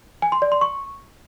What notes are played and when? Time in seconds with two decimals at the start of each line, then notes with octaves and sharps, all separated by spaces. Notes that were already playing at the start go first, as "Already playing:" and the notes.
0.22 G#5
0.32 C6
0.42 D5
0.52 C6
0.61 C#6